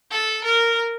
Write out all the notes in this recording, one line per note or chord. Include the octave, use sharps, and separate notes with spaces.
A4
A#4